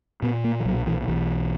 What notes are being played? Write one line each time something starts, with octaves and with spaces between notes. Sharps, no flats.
A#2 B3
A#3
E3
B1 F#3
E3
B1 E3